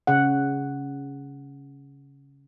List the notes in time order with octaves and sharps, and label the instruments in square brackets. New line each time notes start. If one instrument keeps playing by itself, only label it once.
[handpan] C#3 F#5